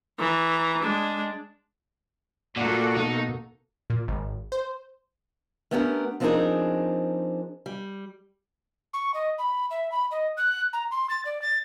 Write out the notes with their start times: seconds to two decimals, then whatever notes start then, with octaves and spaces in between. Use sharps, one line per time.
0.19 E3 A#5
0.81 G#3 D4
2.57 A#2 A#3 F#4 A4 D5 F#5
2.97 B2 D#4
3.90 A#2
4.08 G#1
4.52 C5
5.71 A3 B3 C#4 D4 G4 A#4
6.20 F3 C4 D4 D#4 G#4 A#4
7.66 G3
8.93 C#6
9.14 D#5
9.39 B5
9.70 E5
9.92 B5
10.11 D#5
10.37 F#6
10.73 A#5
10.91 C6
11.10 A6
11.25 D5
11.42 A6